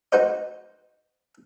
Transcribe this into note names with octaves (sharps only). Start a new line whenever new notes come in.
D#4 F#4 B4 C5 D#5